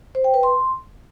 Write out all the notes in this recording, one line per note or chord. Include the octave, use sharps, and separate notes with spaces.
C5
G5
B4
C6